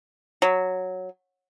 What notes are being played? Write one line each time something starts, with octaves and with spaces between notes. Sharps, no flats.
F#3